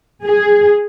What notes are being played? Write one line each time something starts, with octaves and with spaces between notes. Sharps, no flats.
G#4